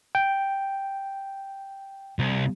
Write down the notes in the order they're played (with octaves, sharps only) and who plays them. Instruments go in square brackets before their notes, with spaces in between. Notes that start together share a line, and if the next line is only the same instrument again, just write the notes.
[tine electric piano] G5
[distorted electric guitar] C2